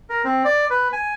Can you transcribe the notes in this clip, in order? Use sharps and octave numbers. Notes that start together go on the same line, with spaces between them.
A#4
C4
D5
B4
G#5